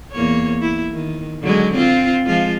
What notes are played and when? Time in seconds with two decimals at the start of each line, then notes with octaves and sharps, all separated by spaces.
0.12 E2 A#3 C#5
0.61 E4
0.94 D#3
1.41 D3 F#3 G#3
1.74 C4 F4
2.27 F3 G#3 F4